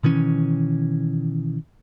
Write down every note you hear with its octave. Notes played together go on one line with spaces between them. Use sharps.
B2 D#3 E3 C#4